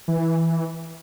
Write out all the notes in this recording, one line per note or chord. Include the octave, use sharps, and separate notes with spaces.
E3